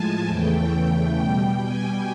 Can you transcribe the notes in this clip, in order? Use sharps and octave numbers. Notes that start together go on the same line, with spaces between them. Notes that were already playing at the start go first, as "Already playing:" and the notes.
Already playing: A2 F3 G#3 G#5 A5
E2 C#3 E3 A3 G5
B2 G3 G5
G#5